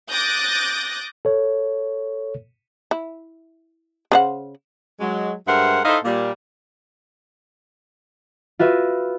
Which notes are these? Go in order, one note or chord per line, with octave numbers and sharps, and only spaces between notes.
D6 D#6 F#6 G6 A6 A#6
A4 C#5
E4
C#3 C5 F#5
F#3 G#3
G2 G#3 A#4 C5 E5 F#5
D#4 E4 A4 C5 D#5 F5
A#2 G3 A#3
F4 F#4 B4 E5